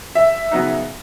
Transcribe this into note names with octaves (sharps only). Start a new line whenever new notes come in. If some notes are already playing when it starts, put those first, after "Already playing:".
E5
C#3 F#3 B3 D#4